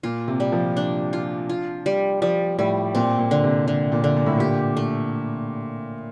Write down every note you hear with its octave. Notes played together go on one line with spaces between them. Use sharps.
A#2 F4
C3
G3
F3
D4
F4
F4
G3
F3 G3
A2 G3
A#2 C4
A#2
D3
C3
D3
A#2
D3
A#2
A2
A#2 G4
A3